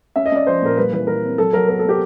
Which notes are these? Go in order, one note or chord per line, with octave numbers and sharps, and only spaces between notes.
C#4 E5
D#5
C#4 D5
F3 C5
A#2 A#4
G3 B4
E3 B4
E3 A#4
C4
F#3 A4
F#3 A#4
B3 A#4
A4
B3 G4